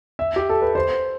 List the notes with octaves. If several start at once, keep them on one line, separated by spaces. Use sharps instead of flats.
E5
G4
A4
B4
C5